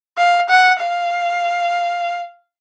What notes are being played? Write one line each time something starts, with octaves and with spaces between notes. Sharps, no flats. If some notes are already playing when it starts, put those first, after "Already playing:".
F5
F#5
F5